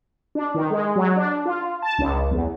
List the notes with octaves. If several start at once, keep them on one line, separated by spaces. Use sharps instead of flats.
D4
D#3
G#3
F#3
D4
F4
A5
C#2
E2